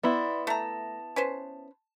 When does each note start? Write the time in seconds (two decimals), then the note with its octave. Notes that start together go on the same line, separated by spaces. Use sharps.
0.03 B3 E4 D5 B5 C6
0.47 A3 A5 A#5
1.16 C#4 B4 C5